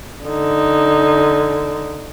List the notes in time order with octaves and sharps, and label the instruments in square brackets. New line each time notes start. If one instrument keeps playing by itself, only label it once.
[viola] D3 D#4